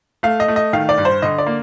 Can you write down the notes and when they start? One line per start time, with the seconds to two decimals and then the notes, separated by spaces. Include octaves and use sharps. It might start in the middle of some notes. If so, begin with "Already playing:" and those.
0.23 A3 F5
0.40 D#5
0.48 A3
0.56 D#5
0.73 D#3 F5
0.89 D5
0.98 G2
1.05 C5
1.22 D3 D#5
1.38 D5
1.46 A#3